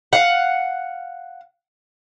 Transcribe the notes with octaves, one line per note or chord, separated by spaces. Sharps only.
F5 F#5